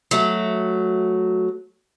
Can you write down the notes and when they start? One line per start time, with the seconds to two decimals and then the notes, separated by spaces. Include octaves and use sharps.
0.11 F#3 A3